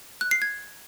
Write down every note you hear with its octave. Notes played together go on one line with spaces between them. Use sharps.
F#6
C7
G#6